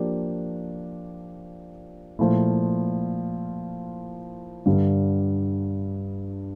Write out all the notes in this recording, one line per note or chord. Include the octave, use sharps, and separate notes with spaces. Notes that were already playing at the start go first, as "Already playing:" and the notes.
Already playing: F3 A#3 D4 G4
A#2 F3 A3 E4
G2 D3 G3